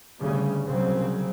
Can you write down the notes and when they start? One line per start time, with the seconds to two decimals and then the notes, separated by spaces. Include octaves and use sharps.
0.20 D2 C#3 G3
0.64 C2 C#3 F#3 C4